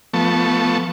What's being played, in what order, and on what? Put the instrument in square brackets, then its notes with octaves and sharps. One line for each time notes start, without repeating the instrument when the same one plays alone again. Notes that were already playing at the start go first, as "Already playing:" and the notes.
[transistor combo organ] F3 A3 B3 A5 C#6